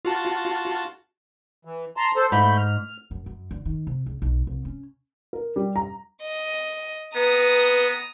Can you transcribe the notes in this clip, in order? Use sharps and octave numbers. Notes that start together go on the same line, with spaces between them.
F4 F#4 A5
E3
A5 A#5 C6
A4 C5
G#2 A3 B5 G6
F6
F#2
F#2
D3
D#3
C3
C#2
B1
C2
C#4
A#4
G3
A#5
D#5
B3 B4 A#5 D#6